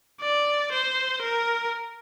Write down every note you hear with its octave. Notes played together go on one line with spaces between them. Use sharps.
D5
C5
A#4